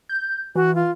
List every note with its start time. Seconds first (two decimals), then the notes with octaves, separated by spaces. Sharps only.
0.09 G6
0.55 E3 F#4
0.75 F4